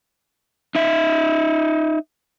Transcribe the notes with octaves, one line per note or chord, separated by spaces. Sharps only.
D#4 E5